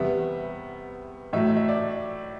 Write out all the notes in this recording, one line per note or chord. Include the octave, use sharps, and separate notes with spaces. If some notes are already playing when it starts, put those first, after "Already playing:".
Already playing: E2 C3 G3 B3 E5
A2 F#3 A3 E5
E5
D5